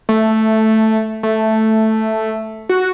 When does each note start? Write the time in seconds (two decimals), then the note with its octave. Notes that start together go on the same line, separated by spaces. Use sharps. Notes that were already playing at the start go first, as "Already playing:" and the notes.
0.09 A3
1.23 A3
2.69 F#4